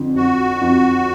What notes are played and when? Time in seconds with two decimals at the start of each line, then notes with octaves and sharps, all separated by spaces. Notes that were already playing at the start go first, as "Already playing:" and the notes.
Already playing: F2 D3
0.16 F2 F#4
0.61 F2